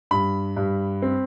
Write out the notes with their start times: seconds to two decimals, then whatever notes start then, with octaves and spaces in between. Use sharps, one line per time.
0.11 G2 B5
0.57 G2
1.02 C4